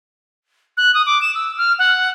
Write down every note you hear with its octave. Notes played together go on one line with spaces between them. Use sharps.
F#6
D#6
D6
E7
E6
F6
F#5